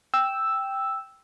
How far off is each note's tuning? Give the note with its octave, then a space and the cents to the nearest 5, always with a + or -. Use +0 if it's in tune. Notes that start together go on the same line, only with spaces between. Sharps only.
G5 +0 E6 +0